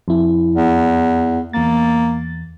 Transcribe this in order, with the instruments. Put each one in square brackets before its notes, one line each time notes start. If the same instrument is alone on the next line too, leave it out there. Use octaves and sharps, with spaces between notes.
[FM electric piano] F2 E4
[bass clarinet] E2
[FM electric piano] E2 A6 [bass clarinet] A#3